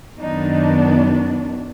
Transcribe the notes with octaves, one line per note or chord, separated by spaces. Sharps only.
F#2 D#3 F#3 B3 D4 D#4